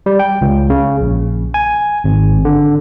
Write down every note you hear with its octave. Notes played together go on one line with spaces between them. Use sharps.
G3
G5
C#2
C#3
A#1
G#5
G#1
D3